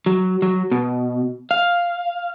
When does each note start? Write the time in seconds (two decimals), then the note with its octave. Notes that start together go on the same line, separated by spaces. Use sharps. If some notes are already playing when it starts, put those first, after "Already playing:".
0.06 F#3
0.42 F#3
0.72 B2
1.51 F5